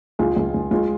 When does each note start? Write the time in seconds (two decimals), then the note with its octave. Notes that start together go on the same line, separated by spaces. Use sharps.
0.19 C#2 F4 G#4
0.36 C#2
0.54 C#2
0.71 G#3 F4 G#4